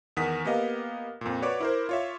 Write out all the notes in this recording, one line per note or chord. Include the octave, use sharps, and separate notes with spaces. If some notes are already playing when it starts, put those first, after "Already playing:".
E2 D#3 F#5 D#6 B6
A#3 B3 G4 D#5 F5
F2 A#2
F#4 B4 C#5 D5 D6
E4 A#4 C5
F4 C#5 E5